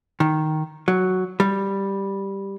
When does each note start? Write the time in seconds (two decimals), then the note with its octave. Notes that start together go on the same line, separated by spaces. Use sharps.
0.20 D#3
0.88 F#3
1.40 G3